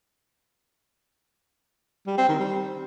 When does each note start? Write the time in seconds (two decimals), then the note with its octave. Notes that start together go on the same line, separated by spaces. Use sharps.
2.07 G3
2.18 C4
2.29 D#3
2.40 G3